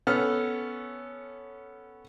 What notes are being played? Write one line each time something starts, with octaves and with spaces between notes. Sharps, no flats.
B3 C#4 A4 F6